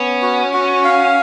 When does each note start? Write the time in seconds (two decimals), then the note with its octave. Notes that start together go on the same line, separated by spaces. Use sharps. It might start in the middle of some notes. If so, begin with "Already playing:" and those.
Already playing: B3 C#4
0.22 F#4
0.53 F#4
0.85 F5